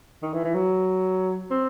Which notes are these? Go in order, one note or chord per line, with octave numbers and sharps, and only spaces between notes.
D#3
E3
E3
F#3
C4